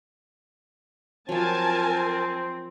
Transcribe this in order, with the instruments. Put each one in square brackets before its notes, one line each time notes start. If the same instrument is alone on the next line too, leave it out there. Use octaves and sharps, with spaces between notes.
[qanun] F3 F#3 [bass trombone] C4 [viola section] A#4 G#5 A5